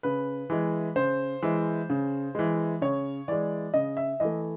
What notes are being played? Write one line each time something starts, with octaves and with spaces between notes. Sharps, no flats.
C#3 B4
E3 G#3
C#3 C5
E3 G#3
C#3
E3 G#3
C#3 C#5
E3 G#3 D5
C#3 D#5
E5
E3 A3 D#5